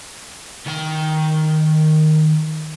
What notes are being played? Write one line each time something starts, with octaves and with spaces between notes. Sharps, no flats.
D#3 G5